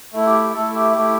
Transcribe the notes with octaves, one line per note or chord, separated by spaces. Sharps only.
A3 E4
G4
G4
A3 E4 A4
G4
A3 E4 G4